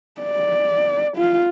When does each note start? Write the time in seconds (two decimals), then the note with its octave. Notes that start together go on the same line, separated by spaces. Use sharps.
0.22 D5
1.17 F4